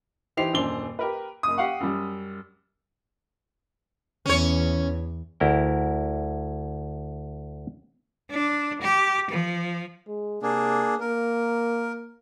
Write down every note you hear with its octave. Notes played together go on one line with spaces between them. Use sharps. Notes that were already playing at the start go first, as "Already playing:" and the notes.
E3 D#4 G4 C5 C7 F7
D#1 F#2 D4 C5 G7
G4 A#4 B4
F#1 D#6
G4 F5 F#5 C#6
F#2 G3
E2 E3 C#4 C#5
D2 E4 A#4 G5
D4
G4
F3
G#3
C3 A#3 D4 G#4
A#3 A#4